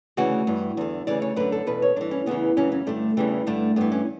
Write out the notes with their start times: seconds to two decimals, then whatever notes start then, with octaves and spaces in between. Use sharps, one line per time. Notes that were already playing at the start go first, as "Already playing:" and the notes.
0.17 D2 C#3 E3 F#4
0.47 G2 E3
0.77 E2 D3
1.07 D2 C#3 E3 D5
1.22 C#5
1.36 F#2 D3 B4
1.52 A4
1.67 E2 B2 B4
1.82 C#5
1.96 G2 E3 D4
2.11 C#4
2.26 E2 C#3 E3 B3
2.57 F#2 C#3 E3 C#4
2.72 C#4
2.87 G2 D3 A3
3.17 E2 C#3 E3 G3
3.47 G2 D3 A3
3.76 G2 E3 B3
3.92 C#4